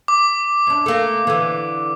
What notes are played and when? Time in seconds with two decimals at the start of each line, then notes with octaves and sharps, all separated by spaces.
0.08 D6
0.67 F#2 D4
0.86 A3 A#3
1.27 D3 E3